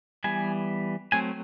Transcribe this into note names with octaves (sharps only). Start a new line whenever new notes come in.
E3 G3 B3 G#5
F#3 A3 C4 G#5